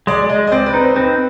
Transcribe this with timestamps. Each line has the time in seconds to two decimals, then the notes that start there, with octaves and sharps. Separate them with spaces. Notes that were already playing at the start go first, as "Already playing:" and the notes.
0.07 G#3 D5
0.23 D5
0.29 G#3 D#5
0.47 D#5
0.52 C4 D5
0.66 B4
0.74 D#4
0.80 C5
0.96 C4 B4